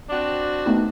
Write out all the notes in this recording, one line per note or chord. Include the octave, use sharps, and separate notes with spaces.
C4 D4 F#4
A3 B3 D#4